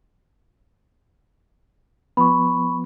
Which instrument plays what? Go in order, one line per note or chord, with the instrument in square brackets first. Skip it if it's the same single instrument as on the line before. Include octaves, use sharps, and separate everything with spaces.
[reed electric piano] F3 B3 [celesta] B5 C#6